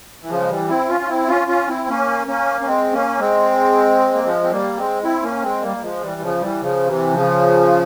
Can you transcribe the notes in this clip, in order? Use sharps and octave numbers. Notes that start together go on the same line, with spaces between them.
E3
C#3 F3
G#3
E3 G3
C4 E4
C#4 F4
C#4
C4 E4
C#4 F4
C#4 F4
C4 E4
A#3 C#4
A#3 C#4
C#4
G#3 C4
A#3 C#4
G#3 C4
A#3
F3 G#3
C4
G3 A#3
G#3 C4
C4 E4
A#3 C#4
G#3 C4
G3 A#3
G3
F3 G#3
E3 G3
C#3 F3
E3 G3
C#3 F3
C3 E3
C#3 F3